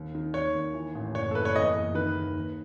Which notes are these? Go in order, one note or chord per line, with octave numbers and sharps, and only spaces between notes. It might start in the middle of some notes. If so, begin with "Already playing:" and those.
Already playing: D#2
D#3
D#2 C#5
D#2
E3
A1
F#1 C#5
A4
F#1 B4
C#5
E2 D#5
F#1
D#3 B4
D#2
D#2